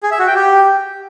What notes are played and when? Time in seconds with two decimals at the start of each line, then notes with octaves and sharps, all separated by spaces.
0.03 G#4
0.11 E5
0.19 F#4
0.27 G5
0.35 G4